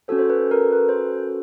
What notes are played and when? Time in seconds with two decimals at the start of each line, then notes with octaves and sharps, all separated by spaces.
0.08 C#4 F#4 A4 C5
0.19 C5
0.30 B4
0.51 A#4
0.72 B4
0.89 C5